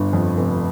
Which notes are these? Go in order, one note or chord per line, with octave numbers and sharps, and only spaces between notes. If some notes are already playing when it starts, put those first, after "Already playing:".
Already playing: G1 G2
F2
F1